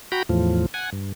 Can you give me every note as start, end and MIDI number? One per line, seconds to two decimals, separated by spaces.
0.12 0.23 66
0.12 0.23 79
0.12 0.23 82
0.12 0.23 83
0.29 0.66 40
0.29 0.66 45
0.29 0.66 53
0.74 0.90 78
0.74 0.90 80
0.92 1.12 43